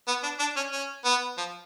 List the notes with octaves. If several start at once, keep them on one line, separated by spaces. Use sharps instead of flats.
B3
D4
D4
C#4
C#4
B3
F3